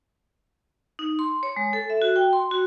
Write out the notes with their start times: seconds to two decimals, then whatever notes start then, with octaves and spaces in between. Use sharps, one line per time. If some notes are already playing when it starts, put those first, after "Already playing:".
0.99 D#4
1.19 C6
1.43 C#5
1.56 G#3
1.73 A4
1.90 E5
2.02 F#4
2.16 G5
2.33 C6
2.51 F#4